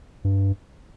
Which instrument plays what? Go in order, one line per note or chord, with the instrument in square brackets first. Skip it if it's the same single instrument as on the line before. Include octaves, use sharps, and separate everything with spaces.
[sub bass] G2